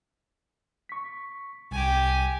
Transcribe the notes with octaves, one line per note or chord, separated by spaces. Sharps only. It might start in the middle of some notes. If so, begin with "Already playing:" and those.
C#6 B6
C2 G4 G#5